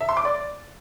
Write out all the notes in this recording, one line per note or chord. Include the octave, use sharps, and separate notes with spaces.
E5
C6
D6
D5